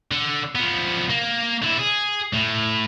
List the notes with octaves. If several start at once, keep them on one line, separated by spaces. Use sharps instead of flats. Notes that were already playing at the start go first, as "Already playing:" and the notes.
D3
F3 B3
A#3
D3 E4
G#4
A2